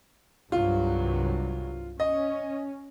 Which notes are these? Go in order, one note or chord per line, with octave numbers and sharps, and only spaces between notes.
C2 G2 F#3 F4
C#4 D#5